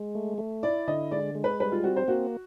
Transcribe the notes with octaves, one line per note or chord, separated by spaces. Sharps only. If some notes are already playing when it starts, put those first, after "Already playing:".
Already playing: G#3
A3
A3
E4 D5
D3 D#5
G#3 D5
G#3
B4
G3 B4
F4
C4 F#4
C5
A#3 F#4